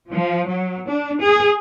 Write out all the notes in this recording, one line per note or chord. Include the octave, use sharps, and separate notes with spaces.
F3
F#3
D4
G#4